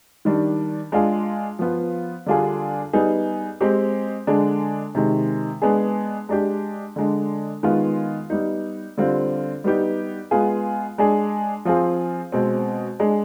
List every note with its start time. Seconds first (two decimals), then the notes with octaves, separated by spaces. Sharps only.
0.25 D#3 G3 D4
0.92 G#3 D4 F4 G#4
1.59 F3 B3 F4
2.26 D3 G3 D4 F4 G#4
2.93 G3 B3 D#4 G#4
3.61 G#3 C4 G4
4.27 D3 G#3 D4 G#4
4.95 C3 D#3 G#3
5.62 G#3 B3 D4 G#4
6.29 G#3 D4 G4
6.96 D3 G#3 D4
7.63 D#3 G#3 B3 F4
8.30 G3 B3 D#4
8.97 D3 G3 C4 F4
9.64 G3 B3 D#4 G4
10.31 G#3 B3 F4 G#4
10.98 G#3 D4 G#4
11.65 F3 C4 F4 G#4
12.32 B2 G#3 C4
13.00 G#3 D4 G#4